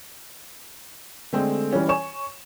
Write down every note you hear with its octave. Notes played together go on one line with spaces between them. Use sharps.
D3 G#3 A3 C4
E3 G3 C#4
C#5 G#5 C#6 E7